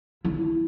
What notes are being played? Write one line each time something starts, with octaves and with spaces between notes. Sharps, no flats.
E4